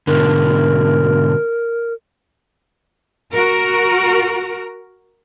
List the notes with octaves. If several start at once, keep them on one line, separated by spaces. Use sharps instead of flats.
G#2 B2 D3 A#4
F#4 A#4